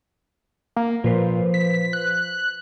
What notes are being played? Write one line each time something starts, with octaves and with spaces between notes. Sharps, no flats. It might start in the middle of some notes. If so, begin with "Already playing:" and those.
A#3
A#2 F3 B4 C5
B6
F#6